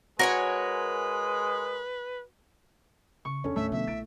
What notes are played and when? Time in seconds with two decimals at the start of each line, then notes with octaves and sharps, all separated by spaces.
0.19 G#3 F#4 A#4 B4 C#5 G#5
3.25 C#3 C#6
3.44 E2 B3 C#4 D4 A4
3.56 D#2 A2 A3 E5
3.72 B2 D3 F3 E5
3.87 A#1 E4 A6 D7